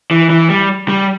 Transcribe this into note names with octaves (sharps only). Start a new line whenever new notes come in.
E3
E3
G3
G3